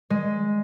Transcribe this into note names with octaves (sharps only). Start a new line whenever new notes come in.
G#3